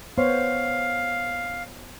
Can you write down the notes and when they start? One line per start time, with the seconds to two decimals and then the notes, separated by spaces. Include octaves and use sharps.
0.18 B3 C5 C#5 F5